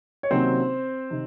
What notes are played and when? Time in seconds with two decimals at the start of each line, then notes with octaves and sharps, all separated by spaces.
0.23 C#5
0.31 C3 D#3 F#3 A#3 C4 C#4 C5
1.10 C3 D#3